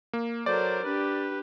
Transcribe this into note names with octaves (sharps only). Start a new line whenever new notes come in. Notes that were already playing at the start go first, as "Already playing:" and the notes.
A#3
F#3 A4 A#4 C5 D5
D4 G4 B4